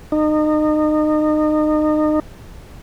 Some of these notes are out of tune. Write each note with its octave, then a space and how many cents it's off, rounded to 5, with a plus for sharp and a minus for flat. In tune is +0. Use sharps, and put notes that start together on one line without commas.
D#4 -30